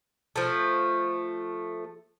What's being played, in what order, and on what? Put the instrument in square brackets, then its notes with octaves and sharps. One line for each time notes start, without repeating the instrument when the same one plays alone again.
[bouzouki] F3 A3